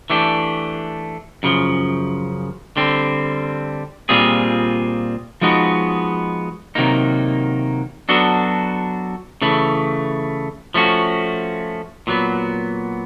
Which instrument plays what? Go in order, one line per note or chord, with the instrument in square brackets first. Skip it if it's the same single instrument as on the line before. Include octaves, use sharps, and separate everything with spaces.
[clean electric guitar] E3 A3 D4 G4
F#2 C#3 F3
D3 G3 C4
A#2 G3 C4 F4 G#4
F3 G#3 B3 D#4 F#4
C3 D#3 F#3 A#3 D#4
F#3 B3 D4 F#4 A4
C#3 E3 A3
F3 A3 C#4 F#4
A#2 F#3 B3